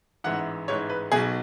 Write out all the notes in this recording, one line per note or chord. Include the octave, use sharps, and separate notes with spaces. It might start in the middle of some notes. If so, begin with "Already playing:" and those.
A1 G#2 E3 F#5
A1 G#2 E3 C#5
B4
B1 B2 G#4